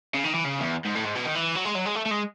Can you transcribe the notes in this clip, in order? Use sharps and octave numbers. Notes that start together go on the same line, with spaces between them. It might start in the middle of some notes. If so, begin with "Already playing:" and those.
C#3
D#3
E3
C#3
E2
G#2
A2
G#2
B2
D#3
E3
F#3
G#3
F#3
G#3
A3
A3
G#3